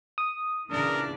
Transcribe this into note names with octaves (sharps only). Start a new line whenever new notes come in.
D#6
A#2 C#3 E3 D4 A#4 D5